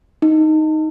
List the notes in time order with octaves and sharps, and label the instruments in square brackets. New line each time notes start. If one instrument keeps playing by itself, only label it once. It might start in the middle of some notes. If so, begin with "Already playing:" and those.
[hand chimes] D#4